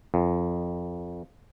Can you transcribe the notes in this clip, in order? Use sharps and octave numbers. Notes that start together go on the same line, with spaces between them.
F2